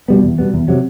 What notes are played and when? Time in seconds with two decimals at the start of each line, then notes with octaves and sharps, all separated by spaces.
0.08 B2 G3 B3
0.23 E2
0.39 B2 G3 B3
0.54 E2
0.68 C3 F#3